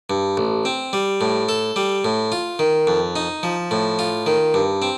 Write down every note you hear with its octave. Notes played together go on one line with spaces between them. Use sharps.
G2
A1
C4
G3
A2
A4
G3
A2
F4
D#3
F2
D#4
F3
A2
F4
D#3
G2
C4